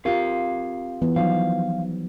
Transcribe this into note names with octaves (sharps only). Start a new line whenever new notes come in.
C4 F4 G4 A#4 F5
E3 B3
F3 F#3 D#4 F5